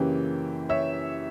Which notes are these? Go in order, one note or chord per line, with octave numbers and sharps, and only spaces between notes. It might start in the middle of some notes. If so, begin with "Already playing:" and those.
Already playing: F#2 C#3 E3 A#3 C#4 G4
C#5 E5